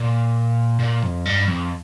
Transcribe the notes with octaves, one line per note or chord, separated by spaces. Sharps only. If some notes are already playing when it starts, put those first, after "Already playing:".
Already playing: A#2
A#2
F2
G2
F2